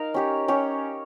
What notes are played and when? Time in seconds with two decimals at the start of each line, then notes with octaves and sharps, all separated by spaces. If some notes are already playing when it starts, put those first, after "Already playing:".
Already playing: D#4 A#4 F5
0.14 C#4 G4 C#5
0.48 C#4 G4 C#5